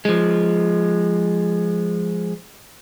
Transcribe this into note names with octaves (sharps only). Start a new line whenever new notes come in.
F3 G#3